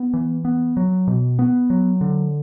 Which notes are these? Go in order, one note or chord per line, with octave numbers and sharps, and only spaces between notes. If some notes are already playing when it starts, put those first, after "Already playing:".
Already playing: B3
E3
B3
F#3
B2
B3
F#3
D3